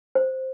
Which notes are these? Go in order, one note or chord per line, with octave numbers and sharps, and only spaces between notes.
C5